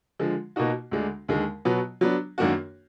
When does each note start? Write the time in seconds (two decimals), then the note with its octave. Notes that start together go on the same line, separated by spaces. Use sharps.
0.19 D3 F3 G#3
0.56 B2 A#3 D#4 F#4
0.92 D2 D3 G#3 D4
1.29 D#2 D3 G#3
1.65 B2 F#3 B3
2.01 F#3 B3 D4
2.38 F#2 D#3 A#3 D4 F#4